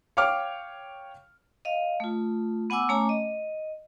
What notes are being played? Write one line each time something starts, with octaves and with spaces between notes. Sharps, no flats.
C#5 F5 G5 D6 F6
D#5 F5
A3 F4
B3 F#5 G#5 D6 E6
A3 C#4 C#5 G#5 A#5 D6
D#5